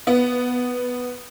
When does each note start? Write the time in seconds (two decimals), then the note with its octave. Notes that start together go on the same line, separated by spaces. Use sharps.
0.07 B3